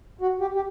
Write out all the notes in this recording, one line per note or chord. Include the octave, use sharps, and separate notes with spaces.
F#4
G4
G4